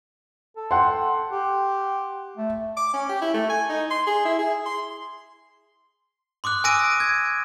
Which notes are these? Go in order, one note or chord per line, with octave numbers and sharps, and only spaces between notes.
A4
F#5 G5 C6
G4
A3
D6
C#4
G4
E4
A3
G#5
D#4
C6
G#4
E4
G#4
C6
C6 D6 D#6 F#6
G#5 D#6 E6 A#6 D7 D#7
G#6